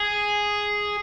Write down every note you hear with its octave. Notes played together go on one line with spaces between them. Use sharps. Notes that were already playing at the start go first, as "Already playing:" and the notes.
Already playing: G#4